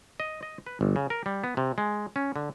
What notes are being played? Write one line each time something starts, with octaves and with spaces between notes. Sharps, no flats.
D#5
D#5
B4
G1
C#3
A#4
G3
B3
C3
G#3
C#4
D3